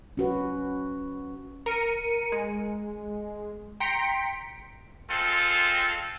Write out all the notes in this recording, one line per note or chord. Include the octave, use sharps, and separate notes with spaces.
C#4 F#4 B4
A#4 C#7 D#7
G#3
G5 A#5 C6 B6 C#7 D7
G#3 C4 F4 A4